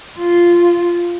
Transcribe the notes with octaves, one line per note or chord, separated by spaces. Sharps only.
F4